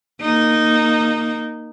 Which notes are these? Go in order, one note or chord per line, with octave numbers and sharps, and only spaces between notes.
A#3 D#4